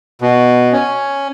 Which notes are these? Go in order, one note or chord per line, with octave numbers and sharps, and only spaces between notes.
B2
C#4